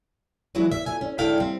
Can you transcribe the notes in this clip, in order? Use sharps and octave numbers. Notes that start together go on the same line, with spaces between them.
E3 F#3 G#3 E4 B4
E5
F2 G#5
C#4
G#2 D3 E4 A4 F5 G5
G3 C4